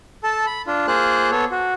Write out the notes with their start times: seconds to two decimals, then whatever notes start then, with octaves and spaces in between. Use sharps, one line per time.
0.23 A4 A5
0.46 B5
0.67 D4 F4
0.88 A#3 F4 G#4 C5 F#6
1.31 B3 A4 C#5
1.51 F#4